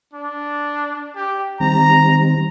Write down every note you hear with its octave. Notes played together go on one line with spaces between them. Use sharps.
D4
G4
D#3 G3 C4 A#5